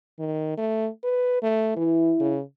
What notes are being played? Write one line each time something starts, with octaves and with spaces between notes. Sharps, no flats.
D#3
A3
B4
A3
E3 E4
C#3